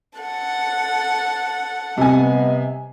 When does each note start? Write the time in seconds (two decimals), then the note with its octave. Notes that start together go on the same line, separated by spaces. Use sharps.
0.19 A4 F#5
1.98 C3 G3 B3 D#5 G#5